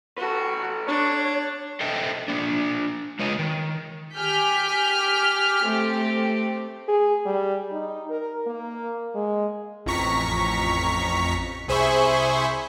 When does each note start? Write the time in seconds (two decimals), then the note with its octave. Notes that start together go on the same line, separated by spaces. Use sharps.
0.18 F#4 A4 B4
0.88 D4 C#5
1.80 A4 C5 D#5 E5 G5
2.28 A#3 D4
3.19 G#3 F4 B4 C#5 D#5
3.39 D#3
4.14 G4 G#5 F6 G6 B6
5.63 A3 C4 G4
6.88 G#4
7.26 G3
7.72 D#4
8.10 A#4
8.47 A#3
9.15 G#3
9.86 A1 F2 A#5 C#6 B6
11.68 C2 G#4 C5 E5 B5 C#6